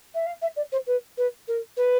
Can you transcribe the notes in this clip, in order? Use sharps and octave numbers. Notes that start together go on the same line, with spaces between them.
E5
F5
E5
D5
C5
B4
B4
A#4
B4